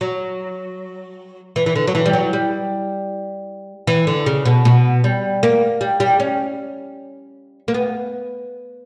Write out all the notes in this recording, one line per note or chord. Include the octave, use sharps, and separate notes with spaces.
F#3
E3
E3
D3
F#3
E3
G3
F#3
G3
E3
D3
C#3
B2
B2
G3
A#3
G3
G3
C#4
A#3
B3